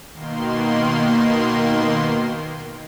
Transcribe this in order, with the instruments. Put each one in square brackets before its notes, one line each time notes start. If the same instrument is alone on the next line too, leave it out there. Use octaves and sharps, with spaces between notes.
[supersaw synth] B2 D#3 A#3 C6